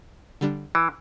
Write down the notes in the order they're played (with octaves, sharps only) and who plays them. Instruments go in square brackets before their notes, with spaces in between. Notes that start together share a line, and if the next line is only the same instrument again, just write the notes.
[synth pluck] D3 G3 D4
[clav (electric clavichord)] E3